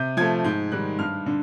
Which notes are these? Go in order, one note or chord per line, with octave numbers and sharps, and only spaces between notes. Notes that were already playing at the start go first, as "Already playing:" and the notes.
Already playing: C3 G6
F3 A3 G#6
G#2 G6
D#3 G3 F#6
G2 F6
D3